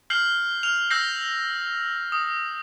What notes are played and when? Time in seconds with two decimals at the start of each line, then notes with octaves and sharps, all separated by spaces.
0.10 F6 G6 C7 F#7
0.63 F6 F7
0.90 E6 G6 A#6 C7
2.12 D#6